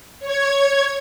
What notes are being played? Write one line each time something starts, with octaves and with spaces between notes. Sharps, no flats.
C#5 G#6